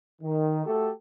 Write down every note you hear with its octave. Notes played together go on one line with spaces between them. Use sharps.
D#3
A3 F#4 G4 A4